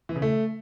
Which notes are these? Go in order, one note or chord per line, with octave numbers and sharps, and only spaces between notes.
E3
C#3
A3